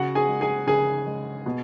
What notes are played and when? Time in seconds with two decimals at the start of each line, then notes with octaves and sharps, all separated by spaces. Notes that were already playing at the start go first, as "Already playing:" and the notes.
Already playing: C#3 F#4 F#5
0.15 G#4 G#5
0.28 G#3
0.41 G#4 G#5
0.67 C#3 G#4 G#5
1.06 G#3
1.46 B2